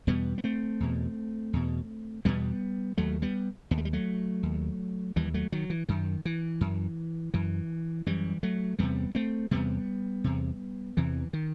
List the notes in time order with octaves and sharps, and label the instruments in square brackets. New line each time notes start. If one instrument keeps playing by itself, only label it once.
[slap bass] E2 B2 G3 B3
B3
A3 C4
E2 B2
E2 B2
E2 B2 G3 B3
D#2 F#3 A3
G3 B3
D#2 B3
A3
G3
F#3 A3
D#2
D#2 E3 G3
F#3 A3
D#3 F#3
E3
F#2 D#3
E3
F#2
F#2 E3
F#2 E3 G3
F#3 A3
E2 C3 G3 B3
A3 C4
E2 C3 G3 B3
E2 C3
E2 C3 E3
D#3